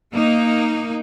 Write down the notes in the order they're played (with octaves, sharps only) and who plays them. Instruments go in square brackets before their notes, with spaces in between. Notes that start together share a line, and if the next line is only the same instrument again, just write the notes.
[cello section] A#3 D#4